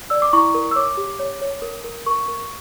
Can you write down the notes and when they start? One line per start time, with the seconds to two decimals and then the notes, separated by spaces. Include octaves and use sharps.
0.10 D5 E6
0.22 D6
0.33 E4 C#6
0.54 A#4
0.71 E6
0.76 C#5 D6
0.97 G4
1.19 C#5
1.41 C#5
1.62 A#4
1.84 A#4
2.06 A#4 C#6
2.28 A#4